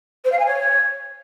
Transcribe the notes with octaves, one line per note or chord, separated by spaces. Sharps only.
C5
F5
G#5
C#5